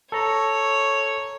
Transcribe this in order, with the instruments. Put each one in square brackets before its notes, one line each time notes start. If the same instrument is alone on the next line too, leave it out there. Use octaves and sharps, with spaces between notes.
[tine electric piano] A4 A#5 [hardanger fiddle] C#5